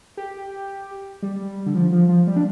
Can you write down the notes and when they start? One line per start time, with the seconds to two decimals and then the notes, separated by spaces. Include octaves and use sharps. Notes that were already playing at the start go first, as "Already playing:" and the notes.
0.17 G4
1.22 G3
1.66 D3
1.75 F3
1.92 F3
2.09 F3
2.27 G3
2.36 D4